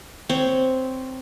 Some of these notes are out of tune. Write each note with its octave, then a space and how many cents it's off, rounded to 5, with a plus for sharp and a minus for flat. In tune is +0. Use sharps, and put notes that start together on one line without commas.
C4 -5 C#5 +0